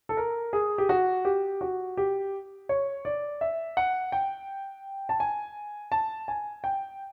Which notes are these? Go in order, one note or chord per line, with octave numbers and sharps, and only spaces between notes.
A4
A#4
G#4
G4
F#4
G4
F#4
G4
C#5
D5
E5
F#5
G5
A5
G#5
A5
G#5
G5